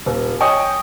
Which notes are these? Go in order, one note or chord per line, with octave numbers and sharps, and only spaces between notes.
D#1
C#5 D#5 G5 G#5 C#6 D#6